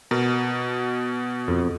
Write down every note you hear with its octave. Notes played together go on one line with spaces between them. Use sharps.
B2 A#4
F2